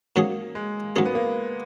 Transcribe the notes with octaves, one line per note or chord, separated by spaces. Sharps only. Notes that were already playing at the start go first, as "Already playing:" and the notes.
G#2 F#3 A#3 C#4 G#4
G#3
G#2 F#3 A#3 C#4 G#4
B3
A#3